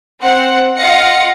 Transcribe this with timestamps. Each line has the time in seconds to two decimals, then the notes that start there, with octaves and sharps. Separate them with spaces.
0.20 C4 C5 F#5
0.78 F4 D#5 F5 F#5 A#6 C#7